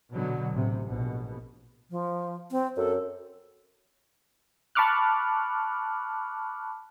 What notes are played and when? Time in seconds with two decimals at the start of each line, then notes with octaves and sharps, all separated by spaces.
0.13 B2 D3 F#3
0.54 A1 C3
0.86 A#1 B2
1.91 F3
2.51 C4
2.77 F#2 A4
4.75 A5 B5 C#6 D6 F6 F#6